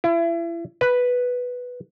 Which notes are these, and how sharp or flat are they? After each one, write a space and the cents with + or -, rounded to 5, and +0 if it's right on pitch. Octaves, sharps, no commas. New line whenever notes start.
E4 +35
B4 +0